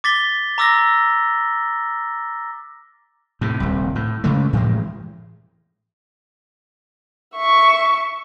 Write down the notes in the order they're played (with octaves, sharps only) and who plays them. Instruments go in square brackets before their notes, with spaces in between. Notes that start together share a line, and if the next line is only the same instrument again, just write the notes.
[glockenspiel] D6 A6 B6 G7
A#5 D6 E6 F6 A#6
[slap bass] A2 C3
D#1 C2
A2
C#3 G#3 A3
A2 E3 F3 G#3
[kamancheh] E5 C#6